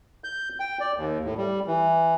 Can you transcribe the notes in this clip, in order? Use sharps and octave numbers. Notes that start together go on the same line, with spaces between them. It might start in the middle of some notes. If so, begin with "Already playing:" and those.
G6
G5
D5
D#2
A2
G3
E3